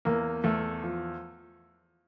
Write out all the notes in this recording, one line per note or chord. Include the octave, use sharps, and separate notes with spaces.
E2 A#3
E2 A3
F3